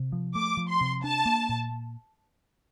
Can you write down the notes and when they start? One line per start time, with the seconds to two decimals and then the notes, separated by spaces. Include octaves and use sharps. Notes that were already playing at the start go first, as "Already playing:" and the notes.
Already playing: C3
0.12 F3
0.35 A3 D6
0.57 F3
0.69 C6
0.81 C3
1.04 D4 A5
1.26 A#3
1.49 A#2